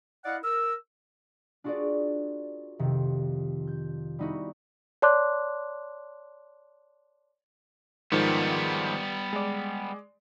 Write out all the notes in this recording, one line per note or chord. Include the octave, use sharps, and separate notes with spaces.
E4 D5 D#5 F5 F#5
A#4 E6
D4 F4 F#4 G#4 A#4 D5
F2 C3 D#3
G6
G3 B3 D#4 E4 F#4
C#5 D5 A5 C6 D6 F#6
G#2 D#3 F3 G3 B3
G#3 D5